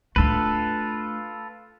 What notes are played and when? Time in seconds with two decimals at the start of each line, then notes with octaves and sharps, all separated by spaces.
0.16 A3 D4 F4 A4 B4